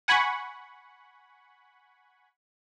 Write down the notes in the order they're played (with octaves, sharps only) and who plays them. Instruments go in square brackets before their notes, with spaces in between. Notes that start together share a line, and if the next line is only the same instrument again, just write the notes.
[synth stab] F#5 G#5 B5 C#6